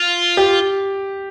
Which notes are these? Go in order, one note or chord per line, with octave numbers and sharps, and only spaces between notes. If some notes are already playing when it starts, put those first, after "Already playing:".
Already playing: F4
G4